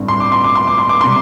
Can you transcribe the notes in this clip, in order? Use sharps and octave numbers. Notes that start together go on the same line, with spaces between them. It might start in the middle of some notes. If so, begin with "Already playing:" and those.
Already playing: A1 G2 D3 G3 C4
C6
D6
C6
D6
C6
D6
C6
D6
C3 G3 C6